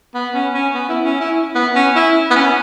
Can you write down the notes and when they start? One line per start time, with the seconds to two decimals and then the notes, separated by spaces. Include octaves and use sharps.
0.14 B3
0.34 C#4
0.54 C#4
0.74 B3
0.89 E4
1.05 C#4
1.20 E4
1.55 B3
1.75 C#4
1.95 E4
2.30 B3
2.36 C#4